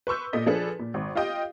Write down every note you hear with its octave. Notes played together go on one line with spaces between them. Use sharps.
B4 C6 C#6 E6 G6
A#2 A4 D#5 B6
F3 D4 G#4 A4 B4
A#2
G#1
F4 G4 D#5 G5